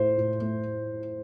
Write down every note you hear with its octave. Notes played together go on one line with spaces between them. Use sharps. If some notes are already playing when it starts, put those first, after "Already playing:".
Already playing: A2 A3 C5
A2
A3